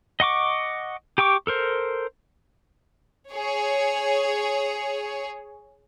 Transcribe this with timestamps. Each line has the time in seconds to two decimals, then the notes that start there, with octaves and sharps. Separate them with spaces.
0.20 D#5 F#5 C#6 D6
1.18 G4 G5 C#6 D6
1.47 A4 A#4 C5
3.32 G#4 C#5